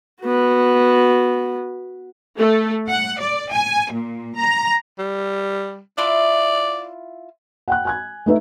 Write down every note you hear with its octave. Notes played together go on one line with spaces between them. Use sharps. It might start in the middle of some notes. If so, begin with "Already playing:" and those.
B3 F#4
A3
F#5
D5
G#5
A#2
A#5
G3
E4 F4 D5
F#5 G5 F#6
G#5 F#6 G#6
A3 D#4 B4 E5